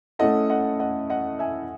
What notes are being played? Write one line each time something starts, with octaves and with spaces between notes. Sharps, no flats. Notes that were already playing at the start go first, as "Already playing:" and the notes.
A3 C#4 E4 A4 D#5 F#5
D#5 F#5
D#5 F#5
D#5 F#5
E5 G#5